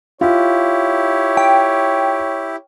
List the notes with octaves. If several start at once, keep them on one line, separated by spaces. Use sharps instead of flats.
E4 F4 G4 C#5
G5